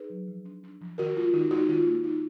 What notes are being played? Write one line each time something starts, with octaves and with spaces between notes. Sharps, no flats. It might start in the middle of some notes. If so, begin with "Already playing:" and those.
Already playing: D#4 G#4 B4
F#3
F3
D4
D4
F3
D#3 F#4 A#4
G#3 F4
D#3 D#4 F#4
G#3 D#4 F#4
D#3 F4
A#3
D#4